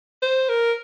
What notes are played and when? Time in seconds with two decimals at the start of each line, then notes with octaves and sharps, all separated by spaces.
0.22 C5
0.49 A#4